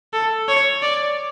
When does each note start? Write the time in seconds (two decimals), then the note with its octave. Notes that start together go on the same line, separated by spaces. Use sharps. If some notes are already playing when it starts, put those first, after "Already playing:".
0.13 A4
0.48 C#5
0.83 D5